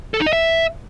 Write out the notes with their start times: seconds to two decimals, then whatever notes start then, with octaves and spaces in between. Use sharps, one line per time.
0.14 A4
0.20 D#4
0.26 D#5
0.33 E5